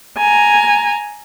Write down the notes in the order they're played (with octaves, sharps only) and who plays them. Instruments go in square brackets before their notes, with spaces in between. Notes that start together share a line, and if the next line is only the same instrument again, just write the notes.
[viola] G#5 A#5